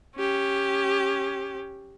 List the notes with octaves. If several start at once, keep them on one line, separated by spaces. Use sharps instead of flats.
C#4 G4